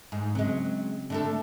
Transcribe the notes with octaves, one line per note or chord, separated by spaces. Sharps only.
G#2
C#3 F#3 G#3 C4
D3 A3 A4